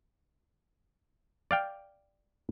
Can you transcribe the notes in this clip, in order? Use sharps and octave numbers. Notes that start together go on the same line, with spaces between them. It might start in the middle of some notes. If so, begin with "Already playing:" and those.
D5 F5 G5